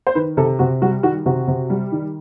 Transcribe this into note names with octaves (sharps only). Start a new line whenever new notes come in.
C5
D#3 B4
C3 A4
C3 F#4
G3 F#4
D#3 F#4
C3 F#4
C3
G3
D#3